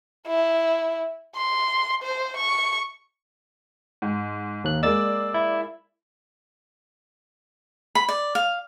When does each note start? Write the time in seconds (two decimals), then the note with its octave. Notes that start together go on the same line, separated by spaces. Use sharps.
0.28 E4
1.36 C6
2.03 C5
2.37 C#6
4.02 G#2
4.64 D#2 F#6
4.83 G#3 A#3 D5 E6 A6
5.34 E4
7.95 B5
8.09 D5
8.35 F5